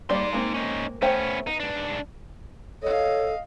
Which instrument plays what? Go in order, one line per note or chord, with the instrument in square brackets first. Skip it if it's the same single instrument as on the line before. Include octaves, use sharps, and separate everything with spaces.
[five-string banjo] G3 A#3 D5 [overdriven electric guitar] D#4 C6
[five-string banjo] G#3 A#3 C4
[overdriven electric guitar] C#4 D#4
[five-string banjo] A3 C5 G5 [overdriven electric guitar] B3 C#4
[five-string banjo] B3 [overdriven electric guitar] D#4
[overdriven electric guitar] G#2 D4
[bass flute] A4 [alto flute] C#5 [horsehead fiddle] D#5 F5